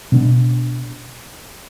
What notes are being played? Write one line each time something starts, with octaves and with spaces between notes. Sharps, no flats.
B2 B3 D4